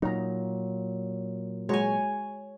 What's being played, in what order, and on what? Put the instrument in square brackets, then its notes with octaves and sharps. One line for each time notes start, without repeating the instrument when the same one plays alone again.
[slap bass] A#2 F#3 [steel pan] D#4 A#5
[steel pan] G#3 F#4 A#5 [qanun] C#5 G#5